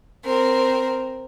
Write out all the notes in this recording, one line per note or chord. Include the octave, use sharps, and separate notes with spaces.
C4 A#4